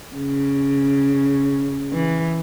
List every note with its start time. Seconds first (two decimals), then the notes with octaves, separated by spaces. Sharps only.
0.16 C#3
1.93 E3